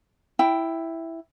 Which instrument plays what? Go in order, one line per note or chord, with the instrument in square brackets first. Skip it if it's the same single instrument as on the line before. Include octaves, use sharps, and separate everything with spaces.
[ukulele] E4 G5